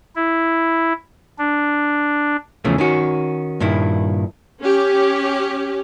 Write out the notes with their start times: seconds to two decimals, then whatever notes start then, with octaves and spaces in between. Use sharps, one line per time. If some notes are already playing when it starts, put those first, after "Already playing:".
0.16 E4
1.38 D4
2.65 E2 C#3 E3 F3 A3
2.78 D#3 C#4 F#4
3.60 G2 A#2 D#3 E4
4.61 C#4 G4